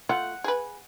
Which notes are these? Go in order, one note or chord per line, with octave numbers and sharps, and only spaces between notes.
A3 F4 F#5
G#4 B4